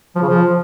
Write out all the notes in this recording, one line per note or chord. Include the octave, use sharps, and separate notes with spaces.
F3
C#3
F3